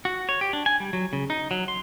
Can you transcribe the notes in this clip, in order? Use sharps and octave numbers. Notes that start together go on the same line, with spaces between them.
F#4
C#5
G4
D4
G#5
G3
F#3
C#3
D#4
F#3
C6